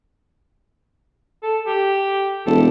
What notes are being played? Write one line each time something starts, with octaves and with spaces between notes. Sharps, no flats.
A4
G4
E1 A4